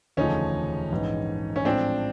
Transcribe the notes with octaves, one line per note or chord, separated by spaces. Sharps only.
E1 D2 C#3 F3 A3 C#4 D#4
A#1 G#2 E3
C#4
A2 F3 G#3 C4 D4